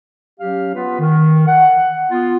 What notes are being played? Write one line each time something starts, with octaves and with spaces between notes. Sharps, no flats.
F#3 C#4 G4 F5
B3 F4 B4
D#3
F#5
B3 F4